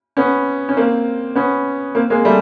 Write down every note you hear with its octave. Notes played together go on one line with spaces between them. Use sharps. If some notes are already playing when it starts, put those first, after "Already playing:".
B3 C#4
C#4
A#3 C4
B3 C#4
A#3 C4
G#3 A#3
G3 A3